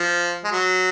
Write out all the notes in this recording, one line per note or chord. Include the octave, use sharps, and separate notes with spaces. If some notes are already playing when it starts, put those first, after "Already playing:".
Already playing: F3
G#3
F#3